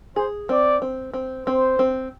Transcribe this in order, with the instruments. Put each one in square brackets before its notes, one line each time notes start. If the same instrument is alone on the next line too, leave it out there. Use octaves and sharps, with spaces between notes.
[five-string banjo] G#4 [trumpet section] C5
[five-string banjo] C4 [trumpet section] D5
[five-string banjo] C4
C4
[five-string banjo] C4 [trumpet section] C5
[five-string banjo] C4